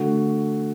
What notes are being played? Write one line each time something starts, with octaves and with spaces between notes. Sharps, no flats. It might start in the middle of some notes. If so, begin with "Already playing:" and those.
Already playing: D3 A3 F#4